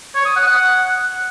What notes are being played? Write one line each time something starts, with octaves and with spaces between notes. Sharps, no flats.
C#5
D#6
F#5
F#5